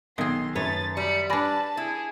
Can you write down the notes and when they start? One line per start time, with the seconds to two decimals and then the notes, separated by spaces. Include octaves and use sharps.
0.18 B1 D#3 G#4 C6
0.56 F#2 A3 B4 C#5 A6
0.97 G3 B5 C#7
1.30 D4 B4 D5 G#5 A5 B5 A#6
1.77 E4 G#4